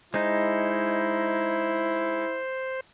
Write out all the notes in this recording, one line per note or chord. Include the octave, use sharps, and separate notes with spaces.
G#3 D#4 E4 C5